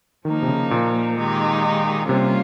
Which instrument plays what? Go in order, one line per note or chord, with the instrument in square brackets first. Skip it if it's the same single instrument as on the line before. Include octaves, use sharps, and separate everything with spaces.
[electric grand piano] D#3 [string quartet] F3 A#3 D#4
[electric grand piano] C3
C#3
A#2
[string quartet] D#3 G#3 D#4 G4
[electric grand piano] C3 [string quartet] G3 A#3 C#4 F4